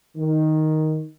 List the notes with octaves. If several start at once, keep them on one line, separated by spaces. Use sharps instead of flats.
D#3